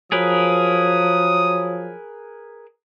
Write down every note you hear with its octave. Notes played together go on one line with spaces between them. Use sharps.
F3 F#3 G#4 A#4 B4 D#6